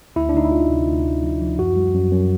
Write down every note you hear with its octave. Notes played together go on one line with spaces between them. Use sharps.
D2 E4
D4
D2 D#4
E4
D2 F4
C3
D2
D2
F3
F3
F#2 F#4
G3
F#2
F#2